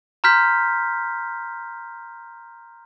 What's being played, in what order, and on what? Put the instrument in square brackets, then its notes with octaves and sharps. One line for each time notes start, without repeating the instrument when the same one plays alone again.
[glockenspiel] A#5 C6 F6 G6 B6